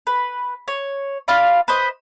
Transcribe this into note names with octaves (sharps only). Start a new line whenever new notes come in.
B4
C#5
F4 D5 F5 B5
B4 C5 D#5